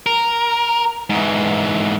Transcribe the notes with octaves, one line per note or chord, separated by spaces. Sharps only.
A#4
G#2 E3